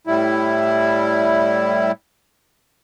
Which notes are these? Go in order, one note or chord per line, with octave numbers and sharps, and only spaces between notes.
A2 G3 E4